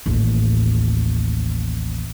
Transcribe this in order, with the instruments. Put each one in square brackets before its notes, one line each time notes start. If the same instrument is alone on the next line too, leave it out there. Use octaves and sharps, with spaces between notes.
[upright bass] A1 D#2